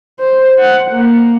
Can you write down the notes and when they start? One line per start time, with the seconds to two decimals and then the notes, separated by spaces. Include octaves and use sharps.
0.19 C5
0.58 F#5
0.91 A#3